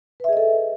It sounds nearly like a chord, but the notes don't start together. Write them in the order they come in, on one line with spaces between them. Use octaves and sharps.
B4 E5 G#4 D#5 A4